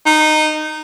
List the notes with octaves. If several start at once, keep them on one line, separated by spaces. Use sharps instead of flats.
D#4